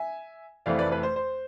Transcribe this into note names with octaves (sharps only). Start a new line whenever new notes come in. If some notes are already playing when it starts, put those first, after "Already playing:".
Already playing: E5 G#5
F1 F2 E3 A3 C4 D5 F5
B4 D5
B4
C5
C5